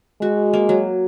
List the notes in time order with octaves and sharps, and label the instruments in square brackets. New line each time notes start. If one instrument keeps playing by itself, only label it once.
[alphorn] G#3 [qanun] F#4
[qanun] A#3
F#3